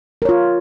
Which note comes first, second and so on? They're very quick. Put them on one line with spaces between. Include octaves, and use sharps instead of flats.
A#4 C#5 F4